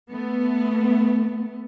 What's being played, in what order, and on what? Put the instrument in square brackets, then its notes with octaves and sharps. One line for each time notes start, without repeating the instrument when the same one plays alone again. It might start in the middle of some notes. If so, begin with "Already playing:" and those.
[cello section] A3 B3